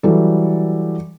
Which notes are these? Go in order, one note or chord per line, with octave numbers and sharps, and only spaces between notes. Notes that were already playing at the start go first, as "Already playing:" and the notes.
E3 F#3 G3 A4